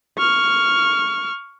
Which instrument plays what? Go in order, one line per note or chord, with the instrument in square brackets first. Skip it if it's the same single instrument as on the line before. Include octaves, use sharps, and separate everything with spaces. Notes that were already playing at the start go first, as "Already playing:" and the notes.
[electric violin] C#6 F6